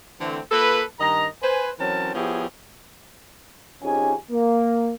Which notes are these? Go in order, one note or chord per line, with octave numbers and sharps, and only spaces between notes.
D3 E3 A3 C4
A#3 F4 A4 B4
G2 D#3 D#5 A#5
B4 C5 G#5
E3 F#3 C4 C#4 A#4 A5
F3 B3 E4 G4 G#4 C#5
F2 C#4 D#4 G4 G#4 G#5
A#3